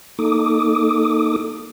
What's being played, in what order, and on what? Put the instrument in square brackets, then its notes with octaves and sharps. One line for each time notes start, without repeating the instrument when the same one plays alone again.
[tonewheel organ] A#3 D#4 A4 D6 D#6